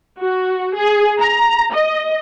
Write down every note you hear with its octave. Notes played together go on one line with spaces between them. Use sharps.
F#4
G#4
A#5
D#5